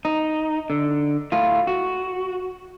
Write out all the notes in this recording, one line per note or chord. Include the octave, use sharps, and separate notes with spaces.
D#4
D3
A2 A3 F4
F#4